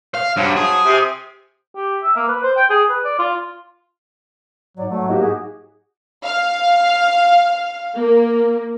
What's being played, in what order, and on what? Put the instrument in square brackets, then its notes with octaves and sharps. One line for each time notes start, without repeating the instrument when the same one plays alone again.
[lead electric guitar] F5
[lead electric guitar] G2 [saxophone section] F3 F#3
[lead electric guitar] G#4
[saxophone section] C3
[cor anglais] G4
E5
A#3
B4
C5
G5
G#4
B4
D5
F4
[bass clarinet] G#2 [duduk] F#3 [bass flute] D5
[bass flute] F#3 [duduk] A3
[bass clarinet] G#2 [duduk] A#3 [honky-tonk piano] D#4 F#4 G4
[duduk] G#4
[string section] F5
A#3